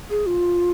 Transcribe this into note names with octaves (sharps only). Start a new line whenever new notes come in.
G#4
F4